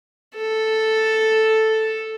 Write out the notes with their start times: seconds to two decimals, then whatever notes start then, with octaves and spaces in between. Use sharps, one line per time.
0.36 A4